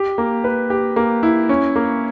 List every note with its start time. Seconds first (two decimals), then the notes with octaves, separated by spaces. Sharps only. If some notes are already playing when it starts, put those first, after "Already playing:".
Already playing: G4
0.18 A#3
0.44 B4
0.70 G4
0.96 A#3
1.23 E4
1.49 C#4
1.76 A#3